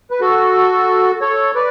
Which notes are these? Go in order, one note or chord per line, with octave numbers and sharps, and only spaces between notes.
B4
F#4 A4
A4 C#5
B4 D5